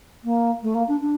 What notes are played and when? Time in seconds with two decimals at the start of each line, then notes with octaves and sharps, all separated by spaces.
0.24 A#3
0.62 A3
0.75 A#3
0.88 D4
1.00 D4